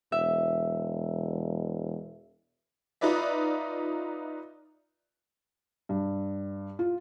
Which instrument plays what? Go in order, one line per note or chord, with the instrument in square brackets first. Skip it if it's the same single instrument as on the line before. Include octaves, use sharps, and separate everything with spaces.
[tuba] E1 [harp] E5
[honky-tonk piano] D#4 F4 B4 D5 E5
[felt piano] G2
F4